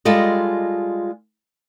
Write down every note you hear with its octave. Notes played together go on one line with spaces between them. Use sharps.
G3 G#3 F4 A4 D#5